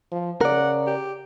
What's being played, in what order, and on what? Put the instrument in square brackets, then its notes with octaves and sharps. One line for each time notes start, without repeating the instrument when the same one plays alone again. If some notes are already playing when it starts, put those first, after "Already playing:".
[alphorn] F3
[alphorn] C#3 [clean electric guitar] A#4 D5 [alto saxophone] F#5
[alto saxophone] G4